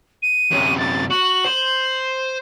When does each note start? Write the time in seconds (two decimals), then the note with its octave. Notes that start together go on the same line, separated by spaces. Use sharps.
0.22 D#7
0.51 F#2 C3
0.78 A6
1.10 F#4 F#7
1.46 C5